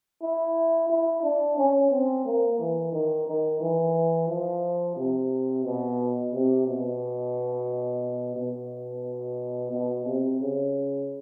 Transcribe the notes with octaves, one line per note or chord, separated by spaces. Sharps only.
E4
E4
D4
C#4
C4
A#3
E3
D#3
D#3
E3
F3
C3
B2
C3
B2
B2
B2
C3
C#3